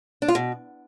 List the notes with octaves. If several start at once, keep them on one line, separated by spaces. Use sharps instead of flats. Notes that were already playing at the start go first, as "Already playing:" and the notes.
D4
F4
B2